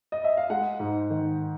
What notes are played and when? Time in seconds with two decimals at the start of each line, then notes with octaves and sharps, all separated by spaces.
0.12 D#5
0.24 E5
0.37 F5
0.50 G#3 F#5
0.80 G#2
1.10 D#3